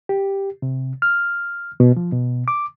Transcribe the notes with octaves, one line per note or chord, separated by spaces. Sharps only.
G4
C3
F6
B2
F3
B2
D6